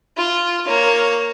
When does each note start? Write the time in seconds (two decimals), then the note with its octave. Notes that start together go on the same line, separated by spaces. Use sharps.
0.17 F4
0.66 A#3 C#5